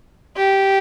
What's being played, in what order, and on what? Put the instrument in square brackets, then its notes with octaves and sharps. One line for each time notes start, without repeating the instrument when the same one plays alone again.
[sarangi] G4